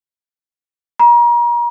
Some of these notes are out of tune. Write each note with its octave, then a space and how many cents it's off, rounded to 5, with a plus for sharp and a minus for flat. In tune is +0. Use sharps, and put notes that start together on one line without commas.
A#5 +35